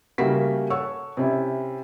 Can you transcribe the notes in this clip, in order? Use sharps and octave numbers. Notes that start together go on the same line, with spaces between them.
C#3 G3 A3 A#3 F#4 B6
A4 C#5 F#5 C#6 E6
C3 C#4 E4